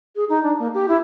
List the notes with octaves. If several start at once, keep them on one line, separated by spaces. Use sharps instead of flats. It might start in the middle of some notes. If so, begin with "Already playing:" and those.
G#4
D#4
D4
A#3
G4
E4